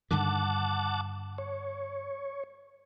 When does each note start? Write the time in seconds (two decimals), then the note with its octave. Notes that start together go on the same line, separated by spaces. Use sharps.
0.11 G2 D3 D#3 F#5 A5 D6
1.38 C#5